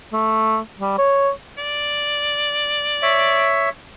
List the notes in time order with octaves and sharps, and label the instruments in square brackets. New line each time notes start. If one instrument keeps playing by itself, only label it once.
[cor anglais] A3
G3
C#5
[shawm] D5
[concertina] C#5 E5